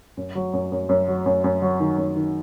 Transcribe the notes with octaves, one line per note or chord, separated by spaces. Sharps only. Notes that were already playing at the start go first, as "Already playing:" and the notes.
F#2
F#3
F#2
F#2
F#2
F#3
F#2
F#2
F#3
D#3
F#2
D#3